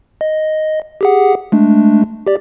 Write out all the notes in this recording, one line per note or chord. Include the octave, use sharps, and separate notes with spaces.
D#5
G4 G#4 F#5
G#3 A3 D4
G4 D5